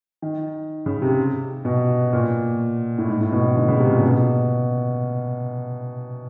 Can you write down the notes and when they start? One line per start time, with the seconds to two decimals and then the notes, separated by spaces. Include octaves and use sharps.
0.22 D#3
0.86 C#3
1.02 C3
1.65 B2
2.13 A#2
2.98 A2
3.08 G#2
3.21 A2
3.32 B2
3.44 A2
3.56 D3
3.68 C#3
3.79 C3
3.91 A#2
4.04 B2